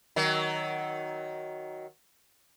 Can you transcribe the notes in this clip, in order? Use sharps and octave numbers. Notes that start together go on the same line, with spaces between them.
D#3 F#3